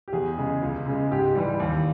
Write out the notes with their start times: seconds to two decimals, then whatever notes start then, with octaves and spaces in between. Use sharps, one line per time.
0.08 G4
0.13 E2 G#4
0.37 C#3 G#3
0.62 C#2
0.86 C#3 G#3
1.11 G#2 G4
1.35 E3 G3
1.60 D#2